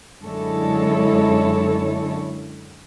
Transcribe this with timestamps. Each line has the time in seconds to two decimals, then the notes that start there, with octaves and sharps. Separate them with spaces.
0.23 F#2 D3 G#3 E4 A4 C#5